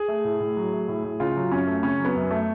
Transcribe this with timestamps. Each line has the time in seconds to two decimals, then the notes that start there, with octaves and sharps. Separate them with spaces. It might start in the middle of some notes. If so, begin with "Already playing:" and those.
Already playing: G#4
0.08 A3
0.24 A2
0.40 A2
0.56 F#3
0.72 A3
0.88 A2
1.04 A2
1.20 C#3 F4
1.36 F#3
1.51 F#2 C#4
1.67 A3
1.83 C#3 C#4
1.99 F#3
2.05 B3
2.15 F#2
2.31 A3